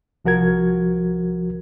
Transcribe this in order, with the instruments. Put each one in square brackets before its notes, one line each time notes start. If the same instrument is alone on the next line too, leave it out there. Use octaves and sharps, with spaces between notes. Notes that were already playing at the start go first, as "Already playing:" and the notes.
[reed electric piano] C2 F3 F#4 A#4 G#6